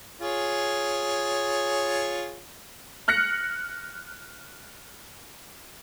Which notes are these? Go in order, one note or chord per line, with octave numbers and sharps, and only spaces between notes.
F4 G#4 C#5
F6 F#6 A#6 C#7